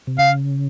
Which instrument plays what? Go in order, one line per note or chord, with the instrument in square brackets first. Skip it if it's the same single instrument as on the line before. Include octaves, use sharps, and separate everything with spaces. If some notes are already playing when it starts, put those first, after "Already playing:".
[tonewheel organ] C3
[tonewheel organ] C#3 [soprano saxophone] F5